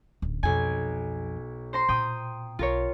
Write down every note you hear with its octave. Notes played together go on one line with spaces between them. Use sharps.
D1 A1
B1 F2 C4 G#5
C5 A#5 C6
A#2 C4 G5 D#6
B1 F4 A#4 C#5